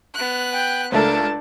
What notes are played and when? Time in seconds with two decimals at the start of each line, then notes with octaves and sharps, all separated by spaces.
0.14 B3 F#6
0.54 G5
0.92 C#2 A3 D4 A#4 A5